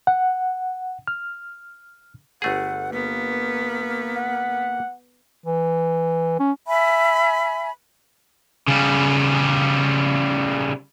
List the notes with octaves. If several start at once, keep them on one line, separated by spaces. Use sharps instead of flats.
F#5
F6
G1 A3 G#4 F#5
A#3 B3
F#5
E3
C#4
E5 G#5 B5
C#3 G3